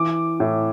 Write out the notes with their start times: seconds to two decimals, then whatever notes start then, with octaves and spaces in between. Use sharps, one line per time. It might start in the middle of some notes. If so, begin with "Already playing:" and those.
Already playing: E3 D6
0.40 A2